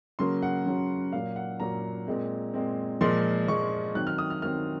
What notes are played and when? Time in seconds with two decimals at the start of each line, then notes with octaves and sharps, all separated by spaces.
0.19 C#3 F#3 A#3 C6
0.42 F#5
0.66 C#3 F#3 A#3
1.13 A#2 F#3 A#3 F5
1.36 F#5
1.60 A#2 F#3 A#3 A#5
2.07 A#2 G#3 C4
2.54 A#2 G#3 C4
3.01 A#2 F3 G#3 C6
3.48 A#2 F3 G#3 C#6
3.95 D#3 F#3 C4 F#6
4.07 F6
4.18 D#6
4.30 F6
4.42 D#3 F#3 C4 F6